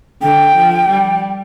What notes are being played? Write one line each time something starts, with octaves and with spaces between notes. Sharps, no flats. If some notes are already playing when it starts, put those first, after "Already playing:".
D3 G5
F3
G3